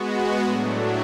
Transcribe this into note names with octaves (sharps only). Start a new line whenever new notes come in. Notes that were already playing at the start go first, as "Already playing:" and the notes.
Already playing: G#3 B3 F#4
A2 F#3 A3 D4